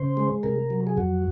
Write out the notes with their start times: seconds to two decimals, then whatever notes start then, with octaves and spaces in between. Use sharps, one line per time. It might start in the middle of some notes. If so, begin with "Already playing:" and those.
Already playing: C#3 C5
0.17 G#3
0.43 C3 A#4
0.70 F#3
0.87 G#4
0.97 F2 F#4